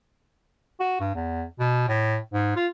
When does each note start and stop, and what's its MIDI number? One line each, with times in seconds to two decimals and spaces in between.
0.80 0.97 66
1.00 1.14 43
1.15 1.44 40
1.60 1.86 47
1.88 2.17 45
2.33 2.53 44
2.56 2.67 65